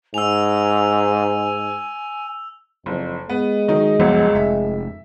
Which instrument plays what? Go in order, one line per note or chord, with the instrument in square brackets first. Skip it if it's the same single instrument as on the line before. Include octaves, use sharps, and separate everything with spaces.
[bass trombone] G#2 [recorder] G#5 [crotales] E6 F7
[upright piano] F#1 [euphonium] F2
[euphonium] G#3 [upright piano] B3
[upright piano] D#3 F#3 D#4
[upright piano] G1 C#2 F#2 [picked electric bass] F3 B3
[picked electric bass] F1 [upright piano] E5